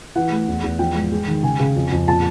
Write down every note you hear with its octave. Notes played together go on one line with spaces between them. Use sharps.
E3 F#5
A3
E2
E2
F3 G5
G#2
G#3
D#3
C#3 G#5
C#3
F2
F2
A#2 A5